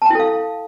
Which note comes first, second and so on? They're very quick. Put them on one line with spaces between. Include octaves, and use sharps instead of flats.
A5 G5 E4 A4 F5